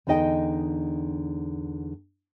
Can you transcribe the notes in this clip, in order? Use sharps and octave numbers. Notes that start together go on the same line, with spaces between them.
E2 D3 D#4 D#5 G5 G#5